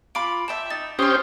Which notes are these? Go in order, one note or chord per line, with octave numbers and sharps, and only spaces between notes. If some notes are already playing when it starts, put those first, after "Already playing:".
F4 B5 D6 D7
E5 G5 A5 E7
D#4 A6
C#4 G4 C5 C6 D#6 F6